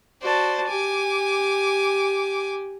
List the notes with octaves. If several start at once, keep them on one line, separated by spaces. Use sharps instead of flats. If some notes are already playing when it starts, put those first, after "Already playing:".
F#4 C5 D5 A5
G4 G#5 D6